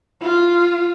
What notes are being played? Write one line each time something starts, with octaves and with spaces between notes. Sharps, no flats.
F4